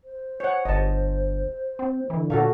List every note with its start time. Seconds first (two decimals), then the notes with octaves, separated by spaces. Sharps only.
0.04 C5
0.40 C#5 F#5
0.65 G1 D#5 A5
1.79 C4
2.10 D3 E3
2.30 A#2 F#4 A4 F5